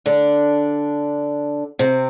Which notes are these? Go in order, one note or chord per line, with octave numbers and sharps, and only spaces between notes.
D3 D4
C3 C4